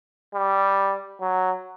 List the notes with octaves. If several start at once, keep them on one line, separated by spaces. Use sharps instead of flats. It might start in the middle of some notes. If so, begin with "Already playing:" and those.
G3
F#3